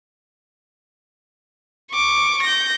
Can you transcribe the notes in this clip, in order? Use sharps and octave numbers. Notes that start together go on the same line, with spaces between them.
C#6 D6
G6 A#6